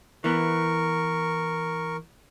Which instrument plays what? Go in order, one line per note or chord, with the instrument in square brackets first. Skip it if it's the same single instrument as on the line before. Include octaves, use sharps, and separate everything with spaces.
[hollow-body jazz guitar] E3 B3 [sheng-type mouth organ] A#4 C#6